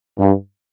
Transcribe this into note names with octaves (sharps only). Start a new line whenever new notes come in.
G2